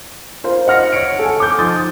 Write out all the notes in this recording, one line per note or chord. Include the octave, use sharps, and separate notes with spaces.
F4 A#4 C5
D#5 F#5 F6 A#6 C#7
C#5 C#7 D7
A4 F#5 G#5
D6 G6
F3 D#4 C6 D6 D#6 A6